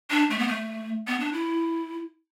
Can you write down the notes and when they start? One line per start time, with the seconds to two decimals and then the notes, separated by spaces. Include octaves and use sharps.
0.11 D4
0.30 A3
0.39 B3
0.48 A3
1.07 B3
1.20 D4
1.33 E4